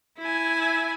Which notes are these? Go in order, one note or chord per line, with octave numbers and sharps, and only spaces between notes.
E4 G#5